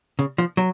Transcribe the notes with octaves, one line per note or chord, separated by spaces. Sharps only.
C#3
F3
F#3